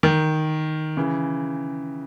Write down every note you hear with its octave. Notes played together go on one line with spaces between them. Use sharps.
D#3
C#3 E3